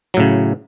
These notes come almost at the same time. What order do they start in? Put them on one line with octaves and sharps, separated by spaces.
F#3 A2 C#3